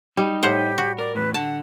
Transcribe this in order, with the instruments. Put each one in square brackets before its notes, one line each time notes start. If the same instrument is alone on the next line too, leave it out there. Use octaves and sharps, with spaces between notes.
[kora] G3 [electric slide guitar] D#4
[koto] A2 C5 F#5 [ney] G4
[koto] F#4
[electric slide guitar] A#4 [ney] D5
[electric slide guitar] E2 A2 [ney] B4
[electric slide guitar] D3 [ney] F#5 [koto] A5